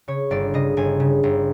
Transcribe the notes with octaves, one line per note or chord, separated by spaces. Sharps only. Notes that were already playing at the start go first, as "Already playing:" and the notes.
C#3 C#5
G1 D5
C#3 D#5
G1 G#5
C#3
G1